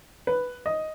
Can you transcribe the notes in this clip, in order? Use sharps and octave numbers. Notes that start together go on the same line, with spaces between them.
B4
D#5